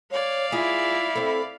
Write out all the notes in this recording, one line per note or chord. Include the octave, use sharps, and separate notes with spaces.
C#5 D5 F5
E4 F4 G#4
C4 A4 B5